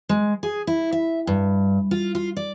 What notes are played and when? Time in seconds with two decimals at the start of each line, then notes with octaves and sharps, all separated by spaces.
0.09 G#3
0.43 G#4
0.67 E4
0.93 E5
1.27 G2
1.91 F4
2.15 F4
2.37 D5